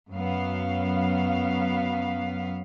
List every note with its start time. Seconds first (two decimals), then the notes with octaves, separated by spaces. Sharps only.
0.11 F#2 F#3 B3 F5